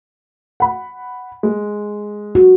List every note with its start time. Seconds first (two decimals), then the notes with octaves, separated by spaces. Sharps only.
0.60 F#5 B5
1.43 G#3
2.35 F#4